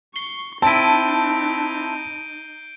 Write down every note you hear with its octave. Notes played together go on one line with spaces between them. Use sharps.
C#6 C7 G7
C4 D#4 E4 A5 G6 D7 D#7